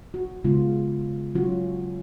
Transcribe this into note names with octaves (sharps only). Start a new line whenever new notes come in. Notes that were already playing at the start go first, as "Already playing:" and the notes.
F#4
C#3 G#3 B3 F4
F#3 C#4 F4 F#4